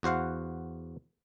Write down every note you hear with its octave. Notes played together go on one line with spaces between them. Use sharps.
E2 F#4 C5 F5 F#5